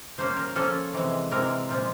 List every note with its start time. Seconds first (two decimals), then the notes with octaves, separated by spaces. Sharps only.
0.18 F3 A#3 C#4 C5
0.37 A#4
0.55 F3 A#3 C#4 A4
0.93 C3 E3 G#3
1.31 C3 E3 G#3 A#4
1.69 A#2 F3 G#3